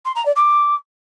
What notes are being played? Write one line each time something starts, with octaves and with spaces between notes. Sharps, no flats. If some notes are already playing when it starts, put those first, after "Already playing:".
C6
A#5
D5
D6